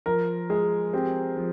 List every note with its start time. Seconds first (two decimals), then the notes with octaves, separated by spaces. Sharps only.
0.06 F3 A#4
0.50 G#3 G#4
0.93 C4 G4
1.37 F3